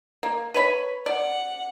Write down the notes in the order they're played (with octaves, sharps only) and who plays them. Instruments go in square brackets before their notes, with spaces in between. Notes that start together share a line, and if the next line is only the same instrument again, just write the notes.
[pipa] A#3
B4 C#5 B5
[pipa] D5 [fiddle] F#5